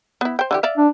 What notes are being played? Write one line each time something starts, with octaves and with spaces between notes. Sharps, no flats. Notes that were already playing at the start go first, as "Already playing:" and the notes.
B3 E4
C5 G5
D3 E3 G4
D5 E5 F5
D4